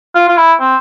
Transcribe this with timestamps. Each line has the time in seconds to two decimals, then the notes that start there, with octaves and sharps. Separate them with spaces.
0.15 F4
0.28 F4
0.37 E4
0.60 C4